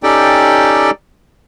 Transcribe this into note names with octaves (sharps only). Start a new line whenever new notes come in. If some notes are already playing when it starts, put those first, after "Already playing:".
C#4 D#4 G4 A4 D5 G5